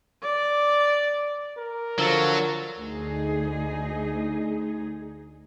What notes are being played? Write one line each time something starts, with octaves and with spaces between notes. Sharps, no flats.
D5
A#4
D3 F3 F#3 E6 A6
D2 D#4 G#4